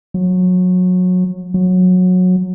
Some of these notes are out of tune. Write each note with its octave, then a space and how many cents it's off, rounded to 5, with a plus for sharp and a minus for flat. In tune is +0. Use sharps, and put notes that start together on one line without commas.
F#3 -25
F#3 -20